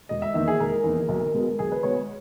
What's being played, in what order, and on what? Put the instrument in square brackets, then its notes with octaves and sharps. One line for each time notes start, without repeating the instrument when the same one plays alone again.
[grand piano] E1 D#5
E5
E2 D#3 A#3 D#4 E5
G#4
E1 A#4
E2 D#3 A#3 D#4
B1 A#4
B2 G#3 B3
B1 G#4
B4
B2 G#3 B3 C#5